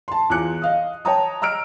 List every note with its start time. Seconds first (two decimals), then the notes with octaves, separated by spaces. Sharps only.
0.08 A5 C6
0.30 E2 F4 D6 F#6 C#7
0.62 D#5 F5 D#6
1.05 C#5 G5 A5 A#5 D#6
1.42 D#5 A#5 E6 F6 D7